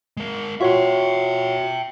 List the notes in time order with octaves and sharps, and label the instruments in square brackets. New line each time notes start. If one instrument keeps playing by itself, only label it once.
[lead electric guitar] G#3 A#4
[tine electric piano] F4 F#4 C#5 [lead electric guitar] E5 G5